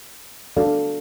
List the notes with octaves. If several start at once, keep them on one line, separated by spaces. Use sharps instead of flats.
D4 F#4 A4 D5 F5